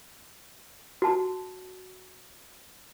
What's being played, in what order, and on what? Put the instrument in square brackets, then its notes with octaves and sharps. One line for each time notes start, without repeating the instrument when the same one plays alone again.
[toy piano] F#4 A5